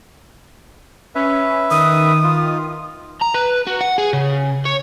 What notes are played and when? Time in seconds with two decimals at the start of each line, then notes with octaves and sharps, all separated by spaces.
1.15 C#4 B4 E5
1.71 D#3 D#6
2.24 F4
3.21 A#5
3.34 B4
3.67 F#4
3.81 F#5
3.98 G#4
4.13 C#3
4.66 C#5